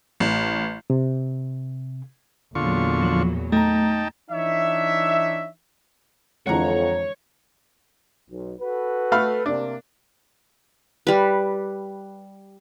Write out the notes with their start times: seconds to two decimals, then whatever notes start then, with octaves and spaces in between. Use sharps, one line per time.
0.20 A1
0.90 C3
2.55 E2 A#2 D3 F#3 F4 C#6
3.03 F3
3.52 A3 D#4 G5 A5 A#5
4.31 E3 D4 D#4 C#5 E5
6.47 F2 D3 E3 G#3 C#5 F#5 A#5
8.29 B1
8.59 F#4 A4 B4
9.12 A3 F5 B5
9.46 C3 A#3 D4
11.07 G3 B4